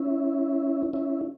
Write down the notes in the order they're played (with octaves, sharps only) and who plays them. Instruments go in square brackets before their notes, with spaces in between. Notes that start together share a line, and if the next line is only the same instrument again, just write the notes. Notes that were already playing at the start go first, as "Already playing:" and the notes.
Already playing: [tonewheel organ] C#4 E4
C#4 E4